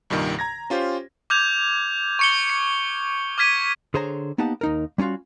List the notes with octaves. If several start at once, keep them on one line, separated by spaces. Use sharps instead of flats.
C2 G2 A#2 D#3
A#5 G#6 A#6
C#4 F4 G4 C5
D6 F6 G6 G#6 F7
C#6 C#7 G7
C#7
D6 F6 G#6 B6 D#7
D3 G#4 C5 C#5 A#5
A#3 B3 D#4 G4 F#5 A5
D#2 D#4 A#4
G3 C#4 D4 F4 F#4